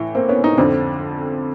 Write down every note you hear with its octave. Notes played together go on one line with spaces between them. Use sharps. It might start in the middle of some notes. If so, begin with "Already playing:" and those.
Already playing: A2 E3
A#3 C4
B3 C#4
C#4 D#4
F2 D3 C4 D4